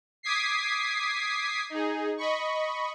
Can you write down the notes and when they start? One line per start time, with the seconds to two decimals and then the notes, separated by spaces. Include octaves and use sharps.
0.23 D6 D#6 G#6 B6 C7
1.70 D#4 G#4
2.17 D#5 B5 C#6